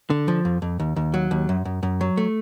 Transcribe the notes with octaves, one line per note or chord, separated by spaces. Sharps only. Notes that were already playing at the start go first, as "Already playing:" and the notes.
D3
F3
F2
F2
D#2
D#2
F#3
D#2
F#2
F#2
F#2
F#3
A3